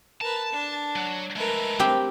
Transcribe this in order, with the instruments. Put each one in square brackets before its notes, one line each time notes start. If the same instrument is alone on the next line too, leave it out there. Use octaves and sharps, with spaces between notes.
[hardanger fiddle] A#4 B4 [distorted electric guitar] A5
[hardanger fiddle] D4
[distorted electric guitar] F#3
[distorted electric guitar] G#3 A3 [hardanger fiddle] A#4 B4
[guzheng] C4 G4 G5